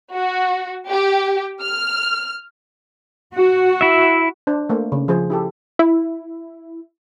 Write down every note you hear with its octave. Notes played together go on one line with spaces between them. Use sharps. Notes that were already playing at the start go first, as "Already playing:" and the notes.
F#4
G4
F6
F#4
E4 E5
D4 C5
A3 A#3 C5
C#3
F3 G#4 C5
E4 G4 A4
E4